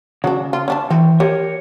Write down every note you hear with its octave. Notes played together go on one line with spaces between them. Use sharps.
C#3 F#3 D4
F4
C#4 D4 A5
E3 C4
G4 A#4 C#5